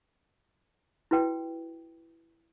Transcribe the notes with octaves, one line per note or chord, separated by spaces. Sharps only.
E4 F#4 B4 G5